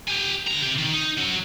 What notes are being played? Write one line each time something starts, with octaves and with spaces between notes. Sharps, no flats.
G4 G#5
D3 A#5
C3 G4
D#3
D#4
F#3 C#4